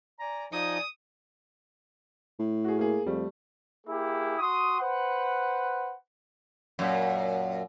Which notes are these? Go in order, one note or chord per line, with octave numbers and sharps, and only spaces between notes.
D5 G#5 A#5
F3 D#4 D5 D#5 G#5 D#6
A2
F#4 G#4
A#3 G#4
F2 G3 A3
A#3 E4 G4 G#4
F#4 C6 D#6
B4 C5 F#5
F#2 A#2